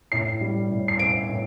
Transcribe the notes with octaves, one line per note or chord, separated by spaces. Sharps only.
A2 C7
G3
A2
C7
C4 D7
A2